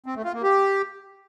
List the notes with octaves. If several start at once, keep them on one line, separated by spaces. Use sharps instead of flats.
C4
A3
F4
A#3
G4